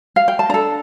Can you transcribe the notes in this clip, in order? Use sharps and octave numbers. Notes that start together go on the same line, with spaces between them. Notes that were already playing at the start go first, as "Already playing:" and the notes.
F5
G5
A5
D4 A4 A#5